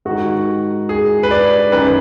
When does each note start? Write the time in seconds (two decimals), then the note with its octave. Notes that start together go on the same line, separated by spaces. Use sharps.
0.05 G#2 D#3 F#4
0.89 G#4
1.23 B4
1.31 D5
1.72 F#2 D#3 B4